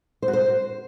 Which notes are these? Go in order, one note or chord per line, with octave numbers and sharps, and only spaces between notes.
C5
F#4
C5